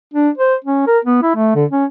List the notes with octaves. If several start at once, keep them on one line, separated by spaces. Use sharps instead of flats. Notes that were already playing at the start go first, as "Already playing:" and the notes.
D4
C5
C#4
A#4
B3
E4
A3
D3
C#4